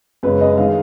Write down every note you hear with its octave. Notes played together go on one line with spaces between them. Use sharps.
F#2 C#3 G#3 C#4 B4
D#5
D#3 G#3 F5